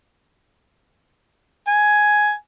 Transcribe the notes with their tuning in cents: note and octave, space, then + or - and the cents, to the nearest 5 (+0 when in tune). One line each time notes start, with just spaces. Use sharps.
G#5 +10